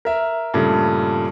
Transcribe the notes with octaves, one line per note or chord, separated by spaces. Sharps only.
A#4 E5
G2 A#2 C#3 A3